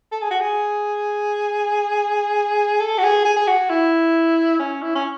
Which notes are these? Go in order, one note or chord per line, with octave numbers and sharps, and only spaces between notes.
A4
G#4
F#4
G#4
A4
F#4
G#4
G#4
G#4
F#4
E4
C#4
E4
C#4